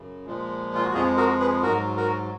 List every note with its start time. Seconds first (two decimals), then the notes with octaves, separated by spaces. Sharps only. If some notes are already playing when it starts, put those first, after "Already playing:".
Already playing: F#2 C#3
0.26 A#2 F3 G#3
0.75 F4
0.85 F#4
0.94 F2 F3 G#3 F4 G#4
1.17 F#4 A#4
1.40 G#4 B4
1.63 G#2 F#3 F#4 A#4
1.97 F#4 A#4